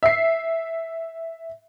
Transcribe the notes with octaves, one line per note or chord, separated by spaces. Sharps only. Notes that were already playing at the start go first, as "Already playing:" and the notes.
E5 C7